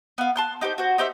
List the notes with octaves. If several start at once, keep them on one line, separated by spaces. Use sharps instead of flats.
B3 F5
A5 C6 F#6
D#4 G4 B4 C5
F#4 C5
D#4 G4 C5 E5